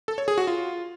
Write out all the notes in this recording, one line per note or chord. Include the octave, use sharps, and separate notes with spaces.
A4
C#5
G#4
F#4
F4